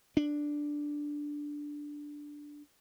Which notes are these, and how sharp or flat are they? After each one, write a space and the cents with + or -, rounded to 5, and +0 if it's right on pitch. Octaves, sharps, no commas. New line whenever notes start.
D4 +0